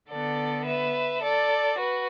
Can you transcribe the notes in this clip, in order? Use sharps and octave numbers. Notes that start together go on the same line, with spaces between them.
D3 B3 A4 D5
B4 E5
A4 D5
F#4 B4